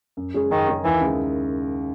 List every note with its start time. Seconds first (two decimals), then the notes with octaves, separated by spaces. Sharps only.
0.17 F#2
0.34 C#3 G#3 C#4 G#4
0.50 F#2 D#3
0.68 C#3 G#3 C#4 G#4
0.85 D#2 E3
1.01 C#3 G#3